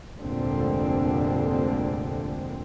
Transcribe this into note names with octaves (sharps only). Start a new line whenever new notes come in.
F1 D2 A#2 D3 G#3 C4